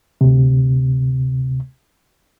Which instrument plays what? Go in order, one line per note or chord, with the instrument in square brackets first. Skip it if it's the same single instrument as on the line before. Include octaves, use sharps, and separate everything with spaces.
[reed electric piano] D2 C3